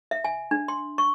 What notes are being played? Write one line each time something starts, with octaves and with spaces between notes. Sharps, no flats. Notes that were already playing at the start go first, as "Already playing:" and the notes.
E5
G#5
D4
C6
C#6